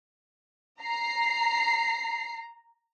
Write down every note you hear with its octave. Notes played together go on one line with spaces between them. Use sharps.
A#5 C7